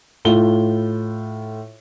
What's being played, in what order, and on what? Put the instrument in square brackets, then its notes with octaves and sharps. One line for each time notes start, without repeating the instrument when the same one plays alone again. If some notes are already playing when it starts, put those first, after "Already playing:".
[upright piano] A2 F4 G7